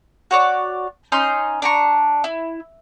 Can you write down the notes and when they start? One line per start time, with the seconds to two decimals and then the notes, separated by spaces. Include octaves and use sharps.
0.31 F#4 C#5 D5
1.12 C#4 D#4 C6 G6
1.62 D4 A#5 C#6
2.24 E4